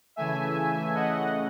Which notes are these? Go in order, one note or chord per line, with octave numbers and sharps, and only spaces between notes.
C#3 E3 A3 E5 G#5
D#5 F#5